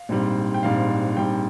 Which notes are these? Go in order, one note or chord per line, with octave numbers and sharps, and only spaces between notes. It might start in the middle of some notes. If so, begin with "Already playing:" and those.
Already playing: F5
A#1 G#2 G3 C4
G5
A#1 G#2 G3 C4 F5
A#1 G#2 G3 C4 G5